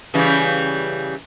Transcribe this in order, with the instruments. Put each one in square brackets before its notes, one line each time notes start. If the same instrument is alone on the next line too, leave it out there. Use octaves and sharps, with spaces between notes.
[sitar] C#3 E3 G3